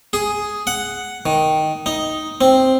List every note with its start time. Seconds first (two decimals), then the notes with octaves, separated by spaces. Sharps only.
0.13 G#4
0.67 F#5
1.26 D#3
1.86 D#4
2.41 C4